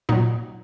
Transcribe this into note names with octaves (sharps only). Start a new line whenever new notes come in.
A#2 F#3 D#4